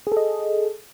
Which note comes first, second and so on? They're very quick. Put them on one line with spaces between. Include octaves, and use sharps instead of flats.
G#4 A4 D#5